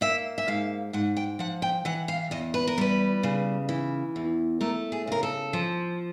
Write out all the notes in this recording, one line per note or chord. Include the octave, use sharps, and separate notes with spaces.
A#3 E5
E5
G#2 F5
G#2 F#5
G5
F3 F#5
G5
E3 F#5
F5
E2 D#5
B4
A#4
G3 B4
C#3
E3
E2
A3 A#4
G#4
C#3 A#4
A4
F3